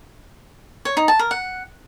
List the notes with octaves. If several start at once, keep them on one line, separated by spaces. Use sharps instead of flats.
C#5
D#4
A5
A#4
F#5